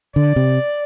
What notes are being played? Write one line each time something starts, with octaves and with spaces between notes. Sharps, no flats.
D3 D5
C3